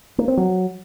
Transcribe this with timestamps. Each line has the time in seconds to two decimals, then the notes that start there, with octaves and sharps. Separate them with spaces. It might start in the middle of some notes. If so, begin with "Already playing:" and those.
0.18 A#3
0.28 C4
0.37 F#3